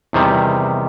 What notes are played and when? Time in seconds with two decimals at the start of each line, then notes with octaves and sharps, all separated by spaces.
0.13 E2 C3 D#3 G3